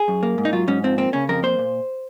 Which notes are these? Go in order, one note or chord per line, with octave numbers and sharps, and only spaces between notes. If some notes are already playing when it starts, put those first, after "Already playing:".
Already playing: G#4
F#2
A#3
G#2
D#4
F#3 F4
G#2 C#4
F3 C4
A#3 C4
C#3 C#4
F2 A#4
A#3 C5
A#2